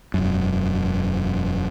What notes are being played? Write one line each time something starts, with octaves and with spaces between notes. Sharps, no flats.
E1 F#2